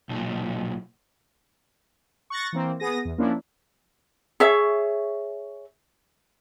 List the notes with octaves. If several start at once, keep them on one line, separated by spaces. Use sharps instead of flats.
B1 A#2
C#6 F#6 A6 A#6
E3 A#3 C4
B3 G#4 D#6 A#6
E2
F3 A#3 C#4 D4 E4
G#4 C#5 E5